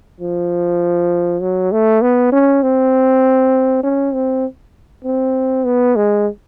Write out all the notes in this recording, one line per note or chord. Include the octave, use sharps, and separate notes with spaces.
F3
F#3
A3
B3
C#4
C4
C#4
C4
C4
B3
G#3